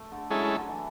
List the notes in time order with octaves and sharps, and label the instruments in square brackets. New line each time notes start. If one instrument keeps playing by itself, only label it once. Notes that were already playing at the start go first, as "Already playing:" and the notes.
Already playing: [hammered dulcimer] A3
D3
[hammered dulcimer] F#3 [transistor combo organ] G#3 C#4 E4 A4
[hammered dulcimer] D3
E3